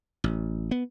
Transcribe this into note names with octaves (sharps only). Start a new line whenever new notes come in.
A1
B3